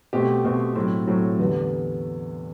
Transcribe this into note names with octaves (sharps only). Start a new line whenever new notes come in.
B2 A3 C4 G4
B2 A3 C4 G4
A2 F#3 C4
A2 F#3 C4
E2 D3 G3 B3